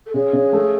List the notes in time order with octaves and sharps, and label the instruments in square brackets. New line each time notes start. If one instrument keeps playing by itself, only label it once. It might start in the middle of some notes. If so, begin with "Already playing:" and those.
[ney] A4
[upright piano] C#3 [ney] G#4
[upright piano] C#3
A3